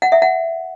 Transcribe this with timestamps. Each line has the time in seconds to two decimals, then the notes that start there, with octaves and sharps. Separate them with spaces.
0.02 F#5
0.12 E5
0.22 F#5